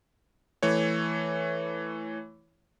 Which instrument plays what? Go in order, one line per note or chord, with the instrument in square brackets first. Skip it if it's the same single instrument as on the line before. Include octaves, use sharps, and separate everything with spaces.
[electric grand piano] E3 A3 C#5